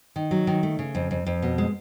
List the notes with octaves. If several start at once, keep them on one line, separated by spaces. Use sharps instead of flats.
D#3
F#3
D#3
A3
C#3
F2
F2
F2
B2
G#3